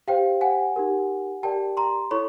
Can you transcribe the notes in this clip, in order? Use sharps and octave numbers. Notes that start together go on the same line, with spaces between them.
G4 C5 F5 G5
F#5 G#5
D#4 G4 A#4
G4 A#4 D5 G5 A5
A#5 C6
E4 A4 C#5 B5 C#6